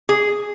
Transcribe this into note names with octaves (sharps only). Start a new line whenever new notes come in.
G#4